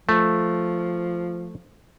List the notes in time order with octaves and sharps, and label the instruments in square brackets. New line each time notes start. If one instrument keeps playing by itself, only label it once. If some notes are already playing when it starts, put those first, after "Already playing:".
[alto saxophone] F3 [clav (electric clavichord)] A3